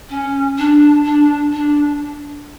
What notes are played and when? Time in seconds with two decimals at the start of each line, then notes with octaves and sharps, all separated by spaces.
0.09 C#4
0.57 D4
1.04 D4
1.52 D4